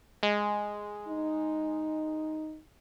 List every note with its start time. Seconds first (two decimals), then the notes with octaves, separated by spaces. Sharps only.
0.23 G#3
1.08 D#4